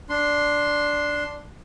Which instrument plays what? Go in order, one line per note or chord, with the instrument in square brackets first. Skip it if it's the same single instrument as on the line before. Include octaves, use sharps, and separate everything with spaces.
[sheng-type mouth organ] D4 C6